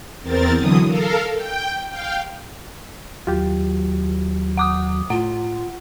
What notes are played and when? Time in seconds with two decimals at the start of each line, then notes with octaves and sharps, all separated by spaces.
0.22 E2 C4 A#4 A6
0.57 D3 E3 F#3 D#6
0.87 A4 A#4 F5
1.34 G5
1.89 F5 G5
3.27 D#2 F#3 F4 G4
4.57 F#5 D6 D#6
5.10 A2 F4 F#5